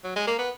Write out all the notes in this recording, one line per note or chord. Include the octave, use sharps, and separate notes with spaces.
F#3
G#3
A#3
B3